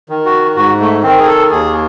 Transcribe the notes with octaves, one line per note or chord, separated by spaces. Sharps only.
D#3
F#4
G#2 F#4
A3
D#3 C4
G#4
A4
D#2 G#4